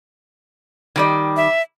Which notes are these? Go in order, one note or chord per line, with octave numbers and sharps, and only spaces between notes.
D#3 G3 D5
E5